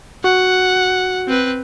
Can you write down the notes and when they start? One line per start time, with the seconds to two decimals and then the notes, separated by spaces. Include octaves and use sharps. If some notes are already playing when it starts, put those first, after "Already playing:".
0.24 F#4 F#5
1.28 C4 B4